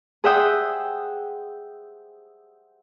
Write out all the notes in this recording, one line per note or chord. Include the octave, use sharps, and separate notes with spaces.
G#4 C5 E5 F#5 G5 D#6